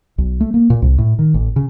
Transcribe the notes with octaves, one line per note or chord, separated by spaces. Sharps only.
B1
A3
A#3
A#2
C2
A2
D#3
A1
C#3